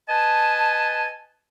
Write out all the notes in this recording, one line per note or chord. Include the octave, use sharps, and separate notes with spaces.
B4 D#5 G#5 A5